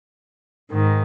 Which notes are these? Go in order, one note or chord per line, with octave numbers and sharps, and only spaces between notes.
G#2 D#3